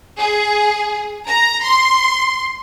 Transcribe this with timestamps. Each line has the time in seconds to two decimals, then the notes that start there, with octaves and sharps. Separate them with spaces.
0.20 G#4
1.26 A#5
1.64 C6